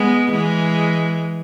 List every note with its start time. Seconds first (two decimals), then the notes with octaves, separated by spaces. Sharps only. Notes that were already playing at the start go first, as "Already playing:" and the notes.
Already playing: G#3 B3
0.32 E3 G#3